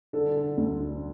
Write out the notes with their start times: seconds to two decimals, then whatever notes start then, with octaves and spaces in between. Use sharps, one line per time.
0.13 D3 A4
0.36 D3
0.57 D2
0.80 D3